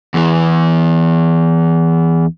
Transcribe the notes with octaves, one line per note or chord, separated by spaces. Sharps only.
E2 E3